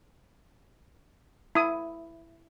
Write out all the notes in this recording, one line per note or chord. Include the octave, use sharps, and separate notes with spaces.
E4 D#6